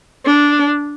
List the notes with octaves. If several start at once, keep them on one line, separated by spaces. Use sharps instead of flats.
D4